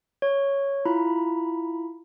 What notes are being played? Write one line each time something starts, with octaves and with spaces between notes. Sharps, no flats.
C#5
E4 F4 A#5 B5